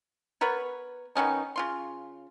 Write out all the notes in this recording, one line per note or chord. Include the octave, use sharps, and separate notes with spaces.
B3 A#4 B4 C#5
D#3 B3 C#4 D#4
C#3 F4 C6